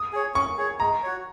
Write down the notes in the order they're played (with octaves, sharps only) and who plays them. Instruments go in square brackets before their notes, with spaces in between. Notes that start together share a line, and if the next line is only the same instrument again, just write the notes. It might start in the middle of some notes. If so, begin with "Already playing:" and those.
Already playing: [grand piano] D#6
[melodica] G#4 C#5
[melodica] C#4 [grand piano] C#6
[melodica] G#4 C#5
[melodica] G#3 [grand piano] A#5
[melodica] F#4 C#5